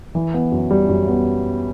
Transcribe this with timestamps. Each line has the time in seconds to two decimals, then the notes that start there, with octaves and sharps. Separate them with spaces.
0.15 E3
0.34 B3
0.52 F#2
0.71 G3
0.89 F#2
1.08 B3